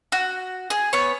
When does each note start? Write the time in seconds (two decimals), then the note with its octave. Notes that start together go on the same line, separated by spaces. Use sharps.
0.12 F#4
0.70 G#4
0.93 B3 C#5